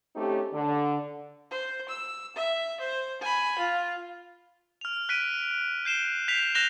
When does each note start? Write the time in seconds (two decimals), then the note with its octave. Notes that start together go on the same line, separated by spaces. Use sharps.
0.15 A3 C4 C#4 D#4 G4
0.53 D3
1.51 C5
1.88 E6
2.36 E5
2.80 C5
3.21 G#5 B5
3.59 F4
4.81 F6 F7
5.09 F#6 B6 D7 D#7
5.85 G6 C7 E7 G7
6.28 G6 B6 C7 F7
6.55 F#6 G6 A#6 E7 F7 G7